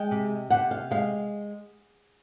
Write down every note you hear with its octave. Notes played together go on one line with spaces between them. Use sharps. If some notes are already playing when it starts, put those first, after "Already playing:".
Already playing: G#3 G5
C3
C3 F#5
F5
G#3 F5